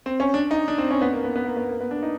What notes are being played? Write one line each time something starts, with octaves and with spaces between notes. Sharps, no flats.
C4
C#4
D4
D#4
D4
C4
C#4
B3
A#3
B3
B3
A#3
B3
A#3
B3
D4
D#4